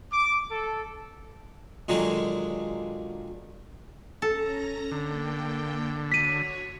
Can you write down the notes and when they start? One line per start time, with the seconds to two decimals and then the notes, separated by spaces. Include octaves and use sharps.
0.12 D6
0.51 A4
1.88 A#2 D3 D#3 F#3 G#3
4.22 C#4 A4 A#5 A#6
4.91 D3 A#3 G5
6.12 F#4 C#5 B6 D#7